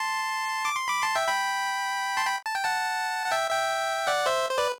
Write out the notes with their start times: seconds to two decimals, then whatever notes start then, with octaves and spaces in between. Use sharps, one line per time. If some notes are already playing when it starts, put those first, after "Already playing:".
Already playing: A5 C6
0.65 D6
0.76 C6
0.88 B5 D6
1.03 A5 C6
1.15 E5 G5
1.28 G5 B5
2.17 A5 C6
2.26 G5 B5
2.46 A5
2.55 G5
2.64 F#5 A5
3.26 F#5
3.31 E5 G5
3.50 E5 G5
4.07 D5 F#5
4.26 C5 E5
4.51 C5
4.58 B4 D5